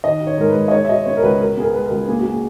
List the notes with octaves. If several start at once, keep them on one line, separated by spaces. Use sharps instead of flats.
D#3 D#5
D#3
C#5
G#2 A#4
B4
G#2
D#5
G#3 C#5
E5
B2 D#5
B3 C#5
A#4
C#2 B4
B2 A#4
B3 G#4
A#4
G#3 B4
A#4
C#2
A#3 G#4
F#4
A#3
G#4